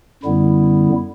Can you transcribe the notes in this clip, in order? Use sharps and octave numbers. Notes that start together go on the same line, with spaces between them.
F#2 D3 G3 B3 E4